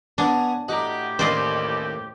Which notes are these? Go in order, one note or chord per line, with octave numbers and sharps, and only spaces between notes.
B3 D4 C#5 G#5 A#5
A2 F#4 G4 D#5 A#5 D6
A1 D#2 D#3 D4 C5 D5 D#5